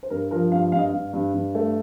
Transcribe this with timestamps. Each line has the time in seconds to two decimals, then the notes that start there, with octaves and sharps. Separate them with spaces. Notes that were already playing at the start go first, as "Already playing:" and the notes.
0.03 C5
0.10 G2 A#4
0.31 F3 A#4
0.52 G2 F5
0.72 G2 F5
0.79 D#5
0.86 F5
0.93 G2
1.13 G2
1.34 G2
1.55 A3